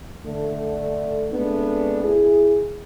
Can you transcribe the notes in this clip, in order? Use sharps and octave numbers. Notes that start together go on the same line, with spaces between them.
D3 A3
G#3 A3 B3 C4 D4
E4 G#4